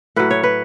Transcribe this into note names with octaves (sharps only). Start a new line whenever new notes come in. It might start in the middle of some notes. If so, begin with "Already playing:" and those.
A2 F#3 B4
C#5
B4